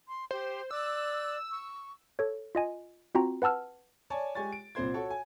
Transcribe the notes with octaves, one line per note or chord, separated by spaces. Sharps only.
C6
G4 C5
D5 D6 E6 F#6
C#6
A4 C#5
F4 D#5 G#5
C4 F4 F#4 G5 A#5
B4 F#5 A5 E6 F6
C#5 D5 G#5 A5
G#3 G4 G#5 C#6 A6
D7
C2 A#2 C4 C5 C6 G#6
F#4 A4 C#5
G#5